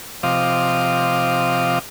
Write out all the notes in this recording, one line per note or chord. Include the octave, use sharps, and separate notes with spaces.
C3 F3 D#5 F5 D6